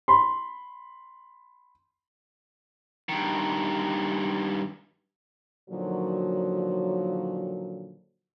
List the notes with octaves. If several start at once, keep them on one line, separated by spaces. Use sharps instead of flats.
B5 C6
G2 D#3
A#2 D3 D#3 F3 F#3